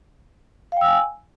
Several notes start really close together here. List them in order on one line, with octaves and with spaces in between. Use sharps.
F5 G5 E6 G#5